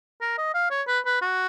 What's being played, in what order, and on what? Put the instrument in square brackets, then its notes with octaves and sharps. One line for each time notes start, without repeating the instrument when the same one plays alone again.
[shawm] A#4
D#5
F5
C#5
B4
B4
F#4